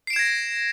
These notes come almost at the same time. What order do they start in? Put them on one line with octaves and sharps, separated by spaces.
C7 D7 E7 G#6 A#6